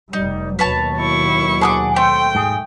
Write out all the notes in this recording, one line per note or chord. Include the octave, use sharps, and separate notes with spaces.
F1 G3 D#4
D#2 B2 F#3 B4 C#5 A5
E4 C#6
D4 G#4 F#5 D6
A3 C4 G5
G#2 G#4